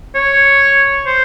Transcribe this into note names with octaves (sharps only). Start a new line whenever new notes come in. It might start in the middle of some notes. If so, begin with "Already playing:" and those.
C#5
C5